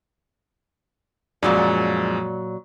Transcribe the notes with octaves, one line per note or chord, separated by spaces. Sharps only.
F#2 A#2 F3 F#3 G#3 D5